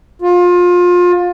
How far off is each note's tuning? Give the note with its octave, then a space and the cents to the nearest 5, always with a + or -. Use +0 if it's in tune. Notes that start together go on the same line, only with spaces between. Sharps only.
F4 +25